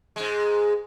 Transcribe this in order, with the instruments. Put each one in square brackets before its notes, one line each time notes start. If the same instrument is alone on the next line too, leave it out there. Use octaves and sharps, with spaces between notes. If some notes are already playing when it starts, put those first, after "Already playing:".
[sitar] G#2 G#3